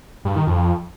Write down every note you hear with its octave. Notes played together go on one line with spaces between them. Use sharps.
G2
D#3
F2